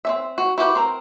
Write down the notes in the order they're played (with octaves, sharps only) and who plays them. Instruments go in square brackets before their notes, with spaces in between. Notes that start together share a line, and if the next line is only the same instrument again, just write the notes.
[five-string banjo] C4 C#4 E5
F#4
E4 F#4 G4 B4
C4 A#4 A#5